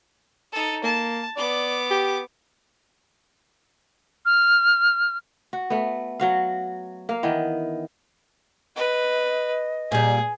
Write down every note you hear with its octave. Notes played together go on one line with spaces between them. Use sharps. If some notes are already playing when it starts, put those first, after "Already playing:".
D#4 A4
A#3 A5
B3 D5 D6
G4
F6
F#4
A3 B3
F#3 F#4 F5
A#3 F5
D#3 E3 B3
B4 D#5
A#2 G3 G#4 G#5